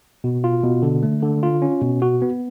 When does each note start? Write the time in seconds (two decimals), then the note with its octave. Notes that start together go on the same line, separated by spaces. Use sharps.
0.24 B2
0.44 F4
0.63 B2
0.82 D3
1.03 A3
1.23 D3
1.43 F4
1.62 C#4
1.82 B2
2.02 F#4
2.22 B3